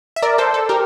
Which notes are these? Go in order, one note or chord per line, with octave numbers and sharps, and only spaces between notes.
E5
A#4 D5
A4 C5
A4
G4 A#4